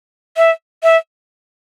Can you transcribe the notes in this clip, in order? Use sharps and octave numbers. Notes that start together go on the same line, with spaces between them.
E5
E5